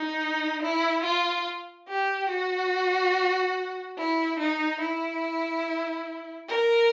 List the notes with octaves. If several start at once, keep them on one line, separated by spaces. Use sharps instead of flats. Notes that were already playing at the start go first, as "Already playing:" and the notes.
Already playing: D#4
E4
F4
G4
F#4
E4
D#4
E4
A#4